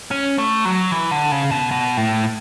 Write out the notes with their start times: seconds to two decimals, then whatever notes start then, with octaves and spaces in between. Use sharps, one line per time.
0.11 C#4
0.38 A3
0.65 F#3
0.91 E3
1.11 D3
1.32 C#3
1.51 B2
1.71 B2
1.97 A2